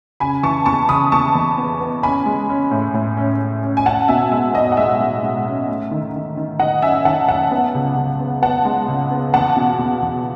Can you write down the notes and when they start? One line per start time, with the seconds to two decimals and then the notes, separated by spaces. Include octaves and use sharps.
0.20 C#3 G#5 B5
0.43 E3 A5 C#6
0.66 E2 A5 C#6
0.89 C#3 B5 D#6
1.12 E2 A5 C#6
1.35 E2
1.58 B3
1.80 B3
2.03 C#4 G#5 B5
2.26 G#3
2.49 C#4
2.71 A2
2.94 A2
3.17 C#4
3.40 C#4
3.63 C#4
3.77 G#5
3.85 C#4 F#5 A5
4.08 B2 E5 G#5
4.32 G#3 E5
4.54 B1 D#5
4.72 F#5
4.77 G#3 E5
5.00 G#3
5.23 G#3
5.46 C#4
5.69 A3
5.91 D#3
6.14 D#3
6.37 D#3
6.59 D#3 D#5 F#5
6.82 F#2 E5 G#5
7.05 D#3 F#5 A5
7.28 F#2 F#5 A5
7.51 B3
7.74 C#2
7.96 C#2
8.20 B3
8.42 B3 F#5 A5
8.65 G#3
8.88 C#2
9.11 B3
9.34 E2 F#5 A5
9.56 B2
9.79 E2
10.02 E2